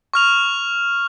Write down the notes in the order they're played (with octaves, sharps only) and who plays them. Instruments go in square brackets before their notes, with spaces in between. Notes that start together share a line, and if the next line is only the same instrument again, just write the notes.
[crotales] C#6 F6 F7